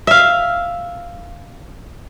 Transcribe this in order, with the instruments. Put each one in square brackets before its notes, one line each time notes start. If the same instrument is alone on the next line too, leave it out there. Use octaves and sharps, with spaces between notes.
[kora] E5 F5